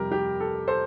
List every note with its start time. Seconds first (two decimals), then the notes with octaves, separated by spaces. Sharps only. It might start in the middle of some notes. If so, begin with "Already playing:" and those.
Already playing: F2 C3 G3 G4 A#4
0.12 G4
0.40 A4
0.68 A4 C5